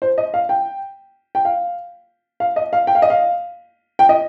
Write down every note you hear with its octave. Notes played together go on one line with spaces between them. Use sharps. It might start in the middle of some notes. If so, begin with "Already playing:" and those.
C5
D#5
F5
G5
G5
F5
F5
D#5
F5
G5
F5
D#5
F5
G5
D#5